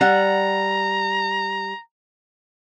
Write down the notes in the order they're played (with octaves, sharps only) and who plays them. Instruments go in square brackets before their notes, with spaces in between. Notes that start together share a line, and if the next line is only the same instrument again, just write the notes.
[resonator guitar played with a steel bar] G3 F#5 [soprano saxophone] A#5